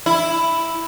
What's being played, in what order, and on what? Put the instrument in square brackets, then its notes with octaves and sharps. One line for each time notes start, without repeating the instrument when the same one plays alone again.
[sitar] E4